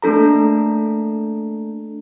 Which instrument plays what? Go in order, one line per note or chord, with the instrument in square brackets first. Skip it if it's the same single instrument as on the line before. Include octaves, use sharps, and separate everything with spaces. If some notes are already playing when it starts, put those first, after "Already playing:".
[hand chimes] A3 A#3 D4 A4 A#5